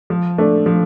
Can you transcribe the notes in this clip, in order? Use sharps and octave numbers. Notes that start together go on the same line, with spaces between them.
F3
A3 D4
F3